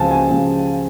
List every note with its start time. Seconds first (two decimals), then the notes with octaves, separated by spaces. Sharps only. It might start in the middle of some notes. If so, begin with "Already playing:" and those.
Already playing: C#2 C#3 F3 G#5 A5
0.11 G#5
0.30 C#2 C#3 F3